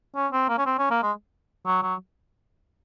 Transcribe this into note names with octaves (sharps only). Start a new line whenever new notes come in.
C#4
C4
A#3
C#4
C4
C#4
A#3
G#3
F#3
F#3